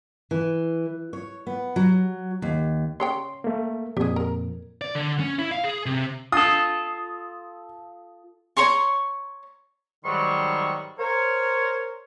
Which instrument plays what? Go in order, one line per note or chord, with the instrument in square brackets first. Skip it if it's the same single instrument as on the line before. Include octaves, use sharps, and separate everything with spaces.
[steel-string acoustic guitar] E3
C#5
B3
F#3
D#2
[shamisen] C#3 C#5 G5 [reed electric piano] C6
[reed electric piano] A3 A#3
[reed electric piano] F2 A#2 [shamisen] G4 G#4
[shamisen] A#4
[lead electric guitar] D5
D3
C#4
E4
F5
G#4
C3
[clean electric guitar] F4 A4 [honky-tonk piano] D#6
[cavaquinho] C#5 A#5 C6 C#6
[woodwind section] G#2 D#3 F#3 G3 C6 C#6
A#4 C5 C#5